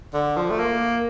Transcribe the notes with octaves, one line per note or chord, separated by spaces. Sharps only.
D3
F3
A3
A#3